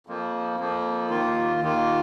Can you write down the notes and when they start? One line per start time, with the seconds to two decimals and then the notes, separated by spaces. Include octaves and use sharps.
0.07 F2 F3 A#3
0.58 F2 F3 A#3
1.10 D#2 D#3 A#3 F4
1.61 D#2 D#3 A#3 F4